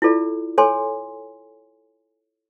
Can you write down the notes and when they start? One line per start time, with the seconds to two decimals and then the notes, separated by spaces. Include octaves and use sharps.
0.02 E4 F4 A4 D5
0.58 A4 C#5 G#5 C6